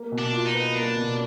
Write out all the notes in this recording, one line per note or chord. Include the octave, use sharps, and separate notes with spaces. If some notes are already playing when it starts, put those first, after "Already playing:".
Already playing: A#3
B2
D4
F4
D#4
B4
A#3 D4
B2